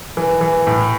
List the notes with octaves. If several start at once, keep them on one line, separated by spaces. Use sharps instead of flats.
E3
E3
A2